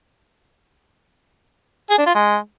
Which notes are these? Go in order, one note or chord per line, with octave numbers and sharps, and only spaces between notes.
G#4
D4
F4
G#3